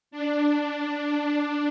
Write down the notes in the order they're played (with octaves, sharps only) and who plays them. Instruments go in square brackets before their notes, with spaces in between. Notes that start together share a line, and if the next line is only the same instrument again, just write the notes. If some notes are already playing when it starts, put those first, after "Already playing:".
[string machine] D4